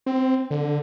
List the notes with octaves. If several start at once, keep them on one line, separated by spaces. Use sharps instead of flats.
C4
D3